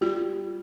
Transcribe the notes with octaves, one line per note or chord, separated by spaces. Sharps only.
G3 F4